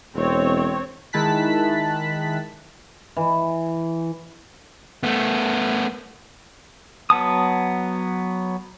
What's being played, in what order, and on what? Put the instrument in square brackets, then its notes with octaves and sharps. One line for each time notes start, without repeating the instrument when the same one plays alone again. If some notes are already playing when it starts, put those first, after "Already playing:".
[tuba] E1 [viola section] C4 C#5
[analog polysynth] D#3 G#3 E4 A5 F#6 B6
[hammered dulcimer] E3
[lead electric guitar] A3 B3
[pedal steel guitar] F#3 B3 A5 D#6